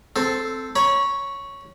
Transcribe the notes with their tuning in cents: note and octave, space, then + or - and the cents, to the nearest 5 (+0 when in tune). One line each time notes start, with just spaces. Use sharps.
C4 -5 A4 +0
C#5 +0 B5 -40